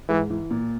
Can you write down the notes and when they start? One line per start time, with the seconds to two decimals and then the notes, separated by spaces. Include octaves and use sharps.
0.09 G#2 E3
0.30 E3
0.51 A#2